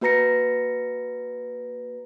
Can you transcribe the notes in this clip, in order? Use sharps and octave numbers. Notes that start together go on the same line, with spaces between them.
A#3 F#4 B4 A#5 A#6 C#7